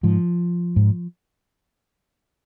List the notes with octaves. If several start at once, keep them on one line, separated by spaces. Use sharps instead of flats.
G#2 F3
G#2